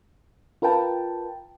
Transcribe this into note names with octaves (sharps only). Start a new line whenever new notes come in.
F4 A#4 B4 G5 A5